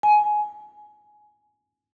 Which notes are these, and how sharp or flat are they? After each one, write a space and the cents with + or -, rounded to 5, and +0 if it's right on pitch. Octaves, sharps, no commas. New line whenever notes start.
G#5 +15